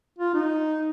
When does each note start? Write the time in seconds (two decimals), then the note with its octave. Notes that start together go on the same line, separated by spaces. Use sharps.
0.19 F4
0.34 D#4